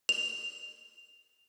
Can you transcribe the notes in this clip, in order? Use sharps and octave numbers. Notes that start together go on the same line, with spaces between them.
F7